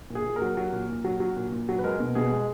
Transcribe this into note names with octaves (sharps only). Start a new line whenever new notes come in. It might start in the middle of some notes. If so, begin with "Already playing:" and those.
A#2
G#4
A#2
A#4
F#3
F#3
A#2
A#2
F#3
F#3
A#2
A#2
F#3
B4
G#3 A#4
B2
B2 G#4
G#3